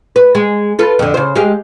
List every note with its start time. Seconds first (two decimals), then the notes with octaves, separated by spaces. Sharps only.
0.16 B4
0.35 G#3
0.79 F4 A4 B4
0.99 F2 D3
1.14 C#3 C5
1.35 G#3 G4 F5